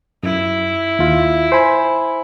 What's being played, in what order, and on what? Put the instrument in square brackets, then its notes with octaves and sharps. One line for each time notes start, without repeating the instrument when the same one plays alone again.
[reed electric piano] F#2 [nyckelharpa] E4
[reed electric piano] D#2 F4
C5 G#5 B5